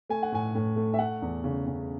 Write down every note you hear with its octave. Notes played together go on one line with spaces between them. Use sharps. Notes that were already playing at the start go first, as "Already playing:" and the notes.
A3 G#5
F#5
A2 G#5
A2
A3
E5
A3 F#5
E2
C#3
C#3